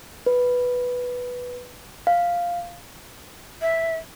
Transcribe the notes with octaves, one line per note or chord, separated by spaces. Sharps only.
B4
F5
E5